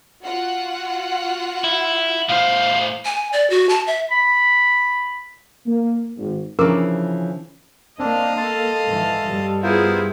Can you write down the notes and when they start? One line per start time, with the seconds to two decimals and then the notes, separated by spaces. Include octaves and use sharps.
0.23 F4 F#4 F#5
1.64 E4
2.29 A2 C5 F5
3.05 G#5
3.33 D5
3.50 F#4
3.69 A5
3.87 E5
4.11 B5
5.66 A#3
6.17 G#1
6.59 C#3 E3 F3 C#4 D4 A#4 D6 E6
7.99 A#3 C4 D4 D#5 F5
8.37 A4 A5 C6
8.85 G#2 E3
9.26 G2 G3
9.63 B3 E4 F4 G#4 A#4 C5